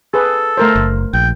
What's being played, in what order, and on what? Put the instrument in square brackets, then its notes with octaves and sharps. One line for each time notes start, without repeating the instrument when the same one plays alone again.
[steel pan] G#4 B4 [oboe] A4
[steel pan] A3 A#4 C5
[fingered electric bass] F#1
[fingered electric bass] A#1 [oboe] G5